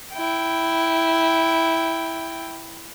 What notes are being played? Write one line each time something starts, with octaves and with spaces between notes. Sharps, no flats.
E4 G5